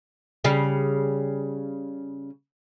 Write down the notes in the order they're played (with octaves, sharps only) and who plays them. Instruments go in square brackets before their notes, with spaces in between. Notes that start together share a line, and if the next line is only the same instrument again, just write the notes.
[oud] C#3 G3